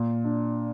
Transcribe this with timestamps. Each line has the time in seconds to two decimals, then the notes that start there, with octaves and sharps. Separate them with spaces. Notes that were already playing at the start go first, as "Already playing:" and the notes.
Already playing: A#2
0.24 D4